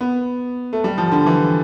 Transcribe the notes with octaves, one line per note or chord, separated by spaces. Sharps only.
B3
A3
G3
F3
D3
E3